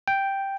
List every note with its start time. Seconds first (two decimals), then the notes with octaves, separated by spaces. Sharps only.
0.08 G5